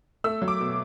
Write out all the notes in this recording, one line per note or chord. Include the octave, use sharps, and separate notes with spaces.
A3 E6
F#3
D6
B2